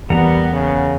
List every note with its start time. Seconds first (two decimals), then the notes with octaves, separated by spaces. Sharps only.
0.10 E2 G3 B3 A#4 F#5 A#5
0.52 C#3